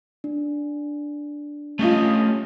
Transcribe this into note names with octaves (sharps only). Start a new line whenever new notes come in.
D4
A3 C#4 F4 G4 D#5